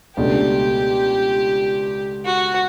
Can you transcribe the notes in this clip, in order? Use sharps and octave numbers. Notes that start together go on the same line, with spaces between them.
C#2 B2 A3 D4 G4
F#4